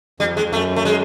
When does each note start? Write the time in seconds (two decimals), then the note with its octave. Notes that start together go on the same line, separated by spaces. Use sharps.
0.20 F2 G3
0.37 G#3
0.44 F2
0.52 F#2 A3
0.76 A3
0.85 G#3